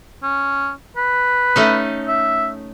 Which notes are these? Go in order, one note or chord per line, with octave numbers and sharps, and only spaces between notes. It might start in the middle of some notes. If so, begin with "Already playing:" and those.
C#4
B4
A3 C#4 D#4
E5